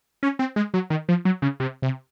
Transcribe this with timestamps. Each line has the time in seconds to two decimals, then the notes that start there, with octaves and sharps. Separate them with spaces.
0.23 C#4
0.39 C4
0.56 G#3
0.74 F#3
0.90 D#3
1.09 F3
1.25 F#3
1.42 C#3
1.60 C3
1.82 C3